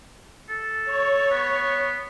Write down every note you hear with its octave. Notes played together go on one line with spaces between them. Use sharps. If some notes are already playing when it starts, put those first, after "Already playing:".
A4
C#5
B3